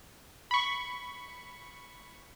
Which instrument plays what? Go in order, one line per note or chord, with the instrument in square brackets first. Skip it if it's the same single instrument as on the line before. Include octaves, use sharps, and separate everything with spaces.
[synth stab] B5 C#6